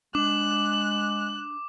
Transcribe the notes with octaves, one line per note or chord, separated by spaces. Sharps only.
G#3 D4 D6 F#6